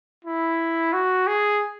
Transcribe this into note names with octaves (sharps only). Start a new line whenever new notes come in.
E4
F#4
G#4